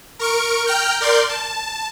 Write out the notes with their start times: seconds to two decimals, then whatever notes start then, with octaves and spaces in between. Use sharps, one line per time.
0.19 A#4 C#6 D7
0.66 G5 A#5 F6 G6
1.00 A#4 D5 C6 G6
1.29 A5